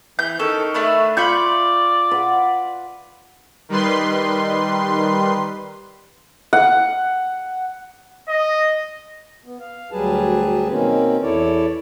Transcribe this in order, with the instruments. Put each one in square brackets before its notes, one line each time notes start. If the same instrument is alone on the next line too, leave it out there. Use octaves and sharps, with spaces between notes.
[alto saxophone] E3 [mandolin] G6
[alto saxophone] D#3 [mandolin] C#4 A4
[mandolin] A3 D4 B4
[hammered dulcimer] F4 [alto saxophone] D5 [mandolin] B5 C#6 G6
[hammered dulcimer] B4 F#5
[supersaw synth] D#3 G3 B4 C6
[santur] F#5
[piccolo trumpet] D#5
[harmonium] B3
F5
D2 F#3 G3 G#4 B4 A5
B2 D#3 A#3 C4 C#4
E2 E4 A4 C#5 D5